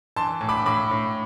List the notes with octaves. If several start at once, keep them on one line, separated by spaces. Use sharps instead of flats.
E3 A5 C6
A2
B5 D6
A2 B5 D6
A2